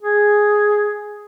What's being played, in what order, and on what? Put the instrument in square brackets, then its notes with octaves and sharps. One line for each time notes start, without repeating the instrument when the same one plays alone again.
[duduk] G#4